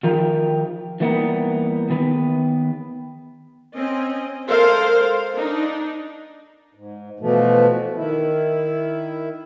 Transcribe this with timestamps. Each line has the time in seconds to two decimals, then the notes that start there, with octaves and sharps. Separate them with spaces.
0.03 D#3 F3 F4 G4 A#4
1.00 E3 G3 A#3 B3 D4 D#4
1.90 D#3 B3 B4
3.76 C4 C#4 D#5
4.48 G#3 A4 A#4 C5 F5
5.34 D4 D#4
6.75 G#2
7.20 B2 E3 F3 A3
7.96 D#3 E4